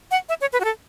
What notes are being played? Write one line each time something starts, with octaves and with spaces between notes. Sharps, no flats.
F#5
E5
C#5
B4
F#4
A4